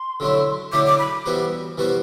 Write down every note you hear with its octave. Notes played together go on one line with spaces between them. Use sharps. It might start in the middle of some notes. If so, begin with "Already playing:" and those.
Already playing: C6
D3 F#3 A3 E4
D3 F#3 A3 E4 D6
D6
B5
E3 G3 B3 F#4 C5
E3 G3 B3 F#4 C5